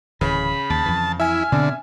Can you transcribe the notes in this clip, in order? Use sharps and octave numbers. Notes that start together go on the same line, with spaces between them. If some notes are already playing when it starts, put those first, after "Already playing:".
D1 C#3 E3 B5
D#2 A5
F2 E3
E4 E5 G#5 F6
B2 D3 C4